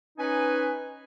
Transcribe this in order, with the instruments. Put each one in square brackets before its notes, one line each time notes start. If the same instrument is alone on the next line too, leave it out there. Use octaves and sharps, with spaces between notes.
[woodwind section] C#4 D#4 B4 G#5